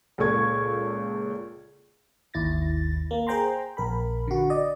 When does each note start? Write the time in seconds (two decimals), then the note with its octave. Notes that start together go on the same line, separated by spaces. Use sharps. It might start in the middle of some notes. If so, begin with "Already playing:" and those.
0.18 C#2 A#2 A4 C#6 G#6
2.34 G#1 D#2 E4 A6 A#6
3.11 A#3
3.27 G#4 C5 G5 A#5 C6
3.77 A#1 A#4 B5
4.28 D3 F#4
4.50 D5 D#5